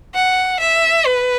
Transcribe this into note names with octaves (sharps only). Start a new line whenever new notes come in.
F#5
E5
B4